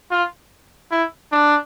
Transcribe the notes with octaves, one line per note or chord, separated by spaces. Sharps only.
F4
E4
D4